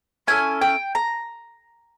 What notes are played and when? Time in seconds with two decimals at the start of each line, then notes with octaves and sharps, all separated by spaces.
0.27 C#4 E4 A4 G#5
0.61 G5
0.95 A#5